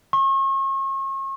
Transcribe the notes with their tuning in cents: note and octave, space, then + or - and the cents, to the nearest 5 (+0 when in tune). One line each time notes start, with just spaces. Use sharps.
C#6 -40